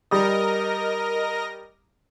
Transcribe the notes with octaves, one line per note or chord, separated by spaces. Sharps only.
G3 A#4 D#5 D#6 A#6